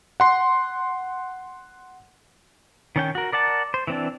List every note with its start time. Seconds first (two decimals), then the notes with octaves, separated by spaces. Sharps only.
0.20 F#5 C6 C7
2.96 D#3 C#4 G5
3.15 F#4 A#4
3.32 A#4 D5 F#5 A5
3.74 C5
3.87 E3 C4 D4